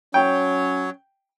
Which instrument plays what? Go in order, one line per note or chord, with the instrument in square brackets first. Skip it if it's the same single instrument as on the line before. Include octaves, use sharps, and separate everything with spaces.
[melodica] F#3 C#5 [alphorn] C#4 [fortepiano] G5